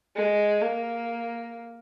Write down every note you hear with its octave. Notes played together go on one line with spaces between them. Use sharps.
G#3
A#3